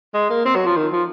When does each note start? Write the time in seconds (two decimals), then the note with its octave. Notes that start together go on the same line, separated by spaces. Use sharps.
0.14 G#3
0.30 A#3
0.45 C4
0.55 F#3
0.66 F3
0.76 D#3
0.92 F3